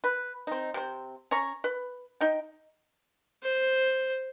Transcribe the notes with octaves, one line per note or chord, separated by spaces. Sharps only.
B4
C4 D#4
C3 C4
C#4 A#5 C#6
B4
D#4 G5
C5